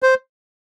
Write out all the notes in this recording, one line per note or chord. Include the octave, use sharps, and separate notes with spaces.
C5